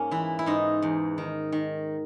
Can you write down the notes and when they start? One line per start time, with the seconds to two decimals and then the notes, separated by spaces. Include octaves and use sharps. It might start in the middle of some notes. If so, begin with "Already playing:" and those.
Already playing: G#2 A#3 C#4
0.11 E3 E4
0.39 E4
0.46 G#2 D#4
0.82 E2
1.18 D#3
1.52 D#3